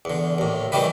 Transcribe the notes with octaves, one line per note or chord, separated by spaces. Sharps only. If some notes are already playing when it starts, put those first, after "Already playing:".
E2 D3
D#2 A2
D#3 E3 G3 A3 G4 B4